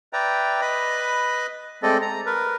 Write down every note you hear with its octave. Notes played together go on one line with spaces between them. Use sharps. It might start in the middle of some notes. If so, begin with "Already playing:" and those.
B4 D5 E5 G5 A#5
B4 D#5 B5
G#3 A3 C4 A4 D5 D#5
A#5
A#4 B4